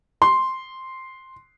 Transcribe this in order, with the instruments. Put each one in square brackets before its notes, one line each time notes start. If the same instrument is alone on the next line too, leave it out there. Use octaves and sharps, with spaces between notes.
[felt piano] C6